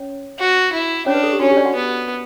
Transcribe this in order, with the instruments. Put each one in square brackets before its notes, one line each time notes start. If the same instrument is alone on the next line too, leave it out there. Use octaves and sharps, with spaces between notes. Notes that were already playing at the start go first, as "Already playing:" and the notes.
Already playing: [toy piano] C#4 C#5
[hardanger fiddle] F#4
E4
[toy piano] C#4 C#5 [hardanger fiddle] D4
[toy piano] B4
A4
G4
[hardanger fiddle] C#4 [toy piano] F#4
[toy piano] G4
D4 D5
F#4 F#5
[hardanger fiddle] B3